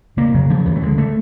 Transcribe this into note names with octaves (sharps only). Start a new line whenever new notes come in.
C#3 A#3
C#3 F#3
C#3 F3
D#2 E3
A3
D3 G#3
A3